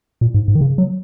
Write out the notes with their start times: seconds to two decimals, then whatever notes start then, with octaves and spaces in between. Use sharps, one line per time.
0.21 A#2
0.34 G#2
0.48 G#2
0.55 D#3
0.61 C#3
0.78 F#3